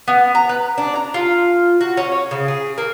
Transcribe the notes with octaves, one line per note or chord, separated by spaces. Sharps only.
B3
A#5
B4
D4
A#5
F4
F#4
C#4
C#5
C#3
G#4
A#3